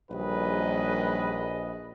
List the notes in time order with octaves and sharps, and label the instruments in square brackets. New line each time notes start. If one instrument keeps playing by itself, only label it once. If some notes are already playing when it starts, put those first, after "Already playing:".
[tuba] A#1 [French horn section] D#3 F#3 G3 [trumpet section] G#4 D#5 [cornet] B4